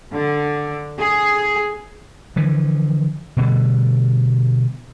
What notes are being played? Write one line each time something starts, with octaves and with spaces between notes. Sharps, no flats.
D3
G#4
D3 E3 F3
B2 D3 G3